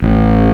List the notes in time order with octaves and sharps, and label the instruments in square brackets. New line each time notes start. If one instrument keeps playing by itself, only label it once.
[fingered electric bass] A1